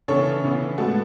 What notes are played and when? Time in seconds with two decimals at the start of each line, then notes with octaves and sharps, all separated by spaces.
0.08 C#3 E3 B3 A4 C#5
0.44 C#3 E3 B3
0.78 A2 G#3 B3 F#4 A4